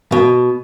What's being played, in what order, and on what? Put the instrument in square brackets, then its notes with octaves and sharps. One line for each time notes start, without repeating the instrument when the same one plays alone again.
[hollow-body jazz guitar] B2